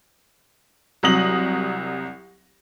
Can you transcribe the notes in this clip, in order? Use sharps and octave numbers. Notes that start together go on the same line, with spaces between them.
C2 F#3 D#6 A#6 F#7